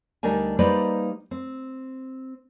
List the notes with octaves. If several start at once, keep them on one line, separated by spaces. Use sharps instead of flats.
D2 G3 D4 D#4 A#4 G#5
G3 A#3 D#4 B4 C5 D5
C4